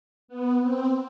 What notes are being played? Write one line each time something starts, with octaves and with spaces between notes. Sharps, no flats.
B3
C4